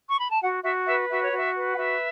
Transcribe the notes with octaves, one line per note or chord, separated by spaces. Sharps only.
C#6
B5
A5
F#4 F#5
F#4 E5
B4 E5
F#4 E5
C#5
F#4 E5
B4
F#5
F#4 E5